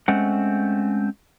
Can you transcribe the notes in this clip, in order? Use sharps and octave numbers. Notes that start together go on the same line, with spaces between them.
G#3 A3 C4 C#4 F#5